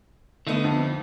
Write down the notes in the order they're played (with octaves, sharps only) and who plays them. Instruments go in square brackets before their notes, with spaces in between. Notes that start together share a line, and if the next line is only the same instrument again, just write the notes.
[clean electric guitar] D3 D#4 [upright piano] A3 B3
[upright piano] F2